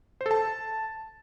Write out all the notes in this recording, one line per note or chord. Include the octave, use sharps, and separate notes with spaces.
C5
A4
A5